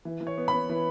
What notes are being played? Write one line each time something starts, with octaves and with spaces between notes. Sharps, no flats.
E3
E3
C#5
B3
B5
B3
E3